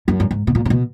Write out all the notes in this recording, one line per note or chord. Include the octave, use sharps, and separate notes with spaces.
F#2
G2
G#2
B2
A#2
C3
B2